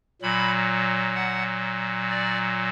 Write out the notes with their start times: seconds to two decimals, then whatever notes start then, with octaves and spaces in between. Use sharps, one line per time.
0.22 A#2 F#3 B5
1.16 F#5
2.10 D5